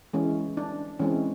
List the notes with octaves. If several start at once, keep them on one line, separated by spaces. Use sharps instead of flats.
E3 G#3 C#4
D4
E3 G#3 C4 C#4